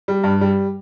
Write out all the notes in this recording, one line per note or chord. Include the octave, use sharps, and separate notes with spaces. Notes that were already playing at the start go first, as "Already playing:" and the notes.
G3
G2
G3